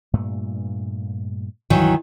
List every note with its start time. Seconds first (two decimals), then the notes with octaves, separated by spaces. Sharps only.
0.13 G2 A#2 A3
1.70 C#2 G2 D#3 E3 F#3